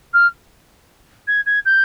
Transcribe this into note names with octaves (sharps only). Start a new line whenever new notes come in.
F6
G#6
G#6
G6